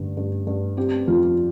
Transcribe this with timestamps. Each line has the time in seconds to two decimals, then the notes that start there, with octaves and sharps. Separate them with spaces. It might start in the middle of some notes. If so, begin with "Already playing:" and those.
Already playing: G2 D3
0.17 G2
0.47 G2
0.77 C4 G4
1.08 F2 F4